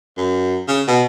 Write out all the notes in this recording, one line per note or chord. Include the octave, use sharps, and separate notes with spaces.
F#2
C#3
B2